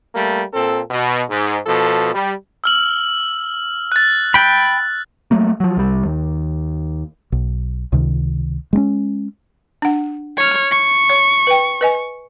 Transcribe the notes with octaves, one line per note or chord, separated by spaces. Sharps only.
G3 A3 A#3
A#2 C4 A4
B2
G#2
B2 F3 A4
G3
E6 F6 F#7
F#6 A6
G5 B5
F#3 A3 A#3
F3 F#3
C2 G3
D#2
B1
C#2 C3 D#3
G#3 B3 C#4
D4 F#5
C#5 F6
C#6
C#5
B4 G5
B4 D#5 G#5